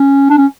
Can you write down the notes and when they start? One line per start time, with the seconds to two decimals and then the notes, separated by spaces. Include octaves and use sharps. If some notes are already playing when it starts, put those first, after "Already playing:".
Already playing: C#4
0.30 D4
0.38 C#4